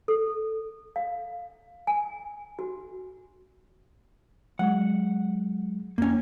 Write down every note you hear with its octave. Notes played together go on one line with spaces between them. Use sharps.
A4
F5
G#5
F#4
F#3 G#3 F#5
F2 A#3 C#4